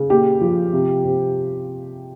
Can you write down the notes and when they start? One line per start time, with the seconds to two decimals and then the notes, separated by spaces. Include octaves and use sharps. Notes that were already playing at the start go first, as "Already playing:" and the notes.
Already playing: C#3
0.10 A#2 G4
0.41 F3
0.73 C3
1.05 C3